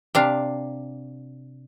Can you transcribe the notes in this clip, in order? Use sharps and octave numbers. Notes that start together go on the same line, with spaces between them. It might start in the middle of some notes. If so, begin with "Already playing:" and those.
C3 D4 F5